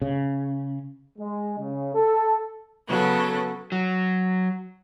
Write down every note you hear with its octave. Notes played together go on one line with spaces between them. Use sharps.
C#3
G#3
C#3
A4
C#3 F#3 B3 A4
F#3